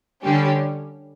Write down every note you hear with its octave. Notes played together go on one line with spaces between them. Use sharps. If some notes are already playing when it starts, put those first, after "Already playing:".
D3 G3 C#4 G4